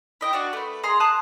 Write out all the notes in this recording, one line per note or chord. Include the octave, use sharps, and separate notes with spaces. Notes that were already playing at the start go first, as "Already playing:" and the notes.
E4 D#5 G5
D4 F#4 D5
A3 B4
G#4 D#5 A#5 C6
A5 A#5 D#6 F#6